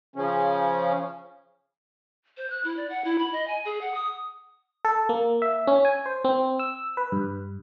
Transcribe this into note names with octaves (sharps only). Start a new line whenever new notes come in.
C#3 F3 C#4
C5
F#6
E4
D5
F#5
E4
B5
D#5
G#5
G#4
F#5
D#6
A4
A#3
E5
C#4
G#5
C5
C4
E6
B4
G2